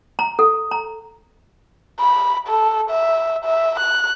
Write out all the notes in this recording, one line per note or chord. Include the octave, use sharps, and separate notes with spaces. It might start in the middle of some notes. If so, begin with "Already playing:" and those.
A#5
A4
A#5
B5
A4
E5
E5
F#6